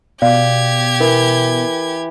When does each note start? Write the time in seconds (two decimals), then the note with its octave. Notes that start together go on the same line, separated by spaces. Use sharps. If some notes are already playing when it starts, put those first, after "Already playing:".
0.22 B2 G4 D5 F5 G#6
1.00 E3 A#4